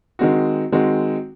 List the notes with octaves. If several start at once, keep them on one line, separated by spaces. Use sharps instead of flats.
D#3 G#3 C4 F#4
D#3 G#3 C4 F#4